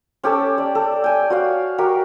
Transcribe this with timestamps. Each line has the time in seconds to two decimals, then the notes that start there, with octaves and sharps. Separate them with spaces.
0.24 C#4 G4 A4 A5
0.58 D5
0.75 A4
1.04 G5 G#5
1.30 F#4 C#5 F5
1.78 F#4 G4 A#4